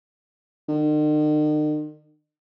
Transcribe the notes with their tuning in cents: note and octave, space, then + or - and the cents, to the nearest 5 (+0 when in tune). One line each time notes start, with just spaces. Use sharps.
D#3 -45